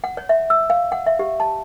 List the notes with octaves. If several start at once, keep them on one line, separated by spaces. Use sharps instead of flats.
F#5
C#5
E5
E6
F5
F#5
E5
G4
A5